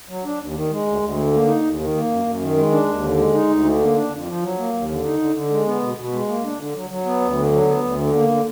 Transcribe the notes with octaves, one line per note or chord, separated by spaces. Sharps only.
F#3
D4
D#2
D#3
G#3
D2
D2
D3
A#3
D#4
D#2
D#3
A#3
F#2
F#2
D#3
G#3
D4
D#2
D3
G#3
D#4
D2
D3
A#3
D4
F2
F3
F#3
A#3
D#2
D3
D#4
D3
D3
G#3
B3
B2
B2
G#3
A#3
D4
D3
F#3
F#3
B3
D2
D3
F#3
B3
D2
D3
A#3
D3